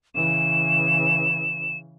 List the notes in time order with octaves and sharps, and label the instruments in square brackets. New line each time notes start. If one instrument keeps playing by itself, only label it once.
[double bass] C#3 E3 [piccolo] E7